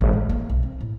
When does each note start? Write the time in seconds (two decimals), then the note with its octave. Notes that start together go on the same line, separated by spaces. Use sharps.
0.01 G#1
0.13 A2
0.29 A#3
0.50 B1
0.63 C4
0.81 A2